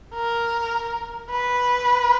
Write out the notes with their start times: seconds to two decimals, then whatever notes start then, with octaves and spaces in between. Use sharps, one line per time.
0.14 A#4
1.30 B4